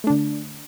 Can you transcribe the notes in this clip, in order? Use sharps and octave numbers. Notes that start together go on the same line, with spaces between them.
D3 A3 D4